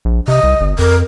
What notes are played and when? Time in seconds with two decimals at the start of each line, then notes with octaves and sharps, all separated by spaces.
0.05 A#1
0.28 C3 D#5
0.43 C2
0.61 G1
0.79 F2 A#4